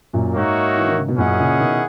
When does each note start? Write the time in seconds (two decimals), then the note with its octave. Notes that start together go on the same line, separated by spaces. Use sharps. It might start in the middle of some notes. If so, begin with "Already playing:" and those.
0.13 F#2 A#2
0.34 G#2 A#3 D#4 F#4 C#5 E5
0.78 E3
0.88 D#3
0.98 C#3
1.08 B2
1.17 F#2 A#2 C#4 E4 G#4 D#5 F#5
1.38 A#2 C#3
1.59 B2 D#3